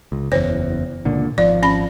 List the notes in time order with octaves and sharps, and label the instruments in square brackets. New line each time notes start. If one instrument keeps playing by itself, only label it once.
[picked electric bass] C#2
[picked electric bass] F#1 E2 [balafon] C5 C#5
[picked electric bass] C#2 A#2 D3
[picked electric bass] G#1 F3 [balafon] D5
[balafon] C#4 B5